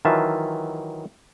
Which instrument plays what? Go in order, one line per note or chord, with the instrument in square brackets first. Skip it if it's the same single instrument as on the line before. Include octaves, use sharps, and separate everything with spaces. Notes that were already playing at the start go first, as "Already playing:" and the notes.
[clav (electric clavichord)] D#3 E3 F#3 F4 E5 A5